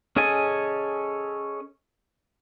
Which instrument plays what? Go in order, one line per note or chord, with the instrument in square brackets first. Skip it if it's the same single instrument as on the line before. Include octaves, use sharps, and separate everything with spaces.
[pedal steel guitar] C#4 G#4 A4 D#5 G#5